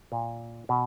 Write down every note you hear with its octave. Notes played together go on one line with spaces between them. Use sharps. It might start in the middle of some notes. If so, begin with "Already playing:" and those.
A#2
B2